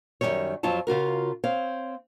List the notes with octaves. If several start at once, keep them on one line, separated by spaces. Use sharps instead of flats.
F#2 B2 D#3 G3 C#5
F2 F#3 F4 C#5 A5
C#3 F4 F#4 A#4
C4 C#5 F5